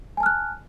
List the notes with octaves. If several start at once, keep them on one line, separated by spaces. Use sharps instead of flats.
G#5 A5 F6 F#6